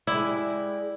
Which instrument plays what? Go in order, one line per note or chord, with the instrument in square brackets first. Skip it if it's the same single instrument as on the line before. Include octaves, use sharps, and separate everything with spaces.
[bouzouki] G#3 G4 D5 [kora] E4